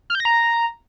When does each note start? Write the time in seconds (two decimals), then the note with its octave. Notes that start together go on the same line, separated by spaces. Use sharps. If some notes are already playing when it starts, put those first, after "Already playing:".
0.10 F6
0.15 G6
0.20 A#6
0.25 A#5